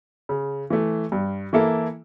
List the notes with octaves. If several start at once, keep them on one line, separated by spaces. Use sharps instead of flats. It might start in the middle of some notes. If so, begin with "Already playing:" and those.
C#3
E3 A3
G2
E3 A#3 E4 A4